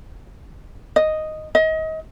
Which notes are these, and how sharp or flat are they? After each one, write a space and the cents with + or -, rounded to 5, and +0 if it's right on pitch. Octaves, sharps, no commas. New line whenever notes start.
D#5 +0
D#5 +30